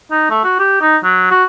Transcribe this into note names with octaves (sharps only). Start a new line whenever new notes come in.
D#4
A3
F#4
G4
D#4
F#3
F#4